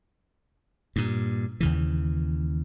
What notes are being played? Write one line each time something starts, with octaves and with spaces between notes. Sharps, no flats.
G2 A#2
D#2 C#3 E3